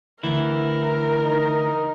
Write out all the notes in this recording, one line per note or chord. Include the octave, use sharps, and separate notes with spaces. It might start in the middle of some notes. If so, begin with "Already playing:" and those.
D2 E3 E4 A#4
D#4